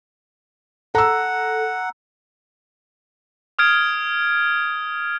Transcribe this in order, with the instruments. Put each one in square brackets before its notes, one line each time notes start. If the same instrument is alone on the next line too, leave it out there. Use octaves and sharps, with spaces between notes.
[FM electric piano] A4 [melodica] F#5 [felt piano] A#5 E6
[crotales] D#6 F6 G#6 D7